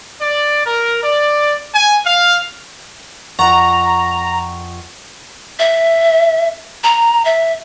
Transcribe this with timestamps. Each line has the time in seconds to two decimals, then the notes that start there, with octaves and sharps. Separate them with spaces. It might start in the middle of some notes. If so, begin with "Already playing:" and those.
0.21 D5
0.66 A#4
1.03 D5
1.75 G#5
2.06 F5
3.39 F2 F#5 A#5 C#6 A6
5.59 E5
6.84 A#5
7.25 E5